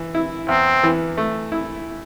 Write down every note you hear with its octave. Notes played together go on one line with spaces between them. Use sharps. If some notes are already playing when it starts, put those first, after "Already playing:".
Already playing: E3
E4
E2 C4
E3
A3
E4